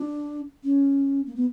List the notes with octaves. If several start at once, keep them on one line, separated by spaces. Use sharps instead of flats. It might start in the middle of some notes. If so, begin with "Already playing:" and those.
Already playing: D4
C#4
A#3
B3